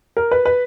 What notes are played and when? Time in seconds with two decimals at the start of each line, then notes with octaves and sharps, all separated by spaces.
0.17 A#4
0.31 B4
0.45 B4